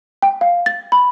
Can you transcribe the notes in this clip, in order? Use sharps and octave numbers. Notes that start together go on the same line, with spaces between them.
G5
F5
A6
B5